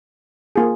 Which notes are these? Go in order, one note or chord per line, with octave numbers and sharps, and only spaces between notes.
A#3 F4 G#4